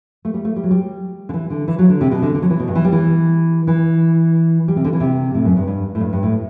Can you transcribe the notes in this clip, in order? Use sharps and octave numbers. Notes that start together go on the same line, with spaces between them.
A3
G3
A3
G3
F#3
G3
D3
E3
D3
E3
F#3
D3
C3
B2
D3
D3
F#3
E3
B2
G2
E3
G3
E3
E3
G3
C3
D3
E3
C3
A2
F#2
G2
G2
A2
G2
G2
A2